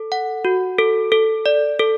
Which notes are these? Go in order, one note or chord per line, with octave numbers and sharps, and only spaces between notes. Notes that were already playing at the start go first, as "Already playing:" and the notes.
Already playing: A4
F#5
F#4
A4
A4
D5
A4